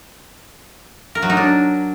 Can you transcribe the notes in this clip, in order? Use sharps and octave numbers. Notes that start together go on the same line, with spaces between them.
A#4
F#3
D#4
D4